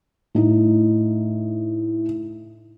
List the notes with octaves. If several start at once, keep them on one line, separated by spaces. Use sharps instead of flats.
A2 D#4